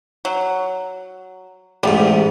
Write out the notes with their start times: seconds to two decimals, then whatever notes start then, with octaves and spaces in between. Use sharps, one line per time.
0.25 F#3
1.83 A1 E2 G#2 G3